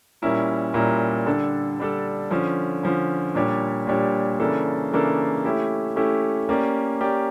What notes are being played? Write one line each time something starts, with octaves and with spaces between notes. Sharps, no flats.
A#2 G3 C#4 E4 A#4
A#2 G3 C#4 E4 A#4
D3 G3 D4 A4
D3 G3 D4 A4
D3 F3 C#4
D3 F3 C#4
A#2 G3 D4 G4 C#5
A#2 G3 D4 G4 C#5
C#3 E3 A#3 D4 A4
C#3 E3 A#3 D4 A4
A3 C#4 E4 G4
A3 C#4 E4 G4
A#3 C#4 G4 D5
A#3 C#4 G4 D5